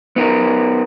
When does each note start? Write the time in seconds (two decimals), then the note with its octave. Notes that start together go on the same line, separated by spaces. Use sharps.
0.16 B3 D#4 A#4